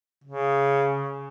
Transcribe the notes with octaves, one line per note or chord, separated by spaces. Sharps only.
C#3